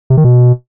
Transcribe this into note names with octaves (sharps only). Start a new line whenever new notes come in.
C3
D#3
B2